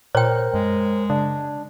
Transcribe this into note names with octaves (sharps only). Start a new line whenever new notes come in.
A#2 A#4 C5 C#5 G5
F#2 G#3
C#3 D4